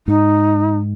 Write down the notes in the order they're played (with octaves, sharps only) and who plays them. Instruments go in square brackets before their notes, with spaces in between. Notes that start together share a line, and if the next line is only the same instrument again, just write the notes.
[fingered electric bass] G#2 [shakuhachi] D#4